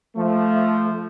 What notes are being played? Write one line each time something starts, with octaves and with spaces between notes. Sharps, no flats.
F3 A3